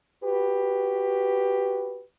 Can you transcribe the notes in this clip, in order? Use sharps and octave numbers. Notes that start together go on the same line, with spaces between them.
F#4 G4 B4